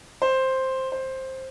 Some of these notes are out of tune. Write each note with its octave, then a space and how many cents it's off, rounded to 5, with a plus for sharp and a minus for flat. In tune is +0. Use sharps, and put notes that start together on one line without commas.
C5 +5
C5 +10